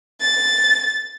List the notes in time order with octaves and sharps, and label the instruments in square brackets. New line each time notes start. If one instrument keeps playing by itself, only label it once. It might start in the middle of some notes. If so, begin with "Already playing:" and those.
[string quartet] A6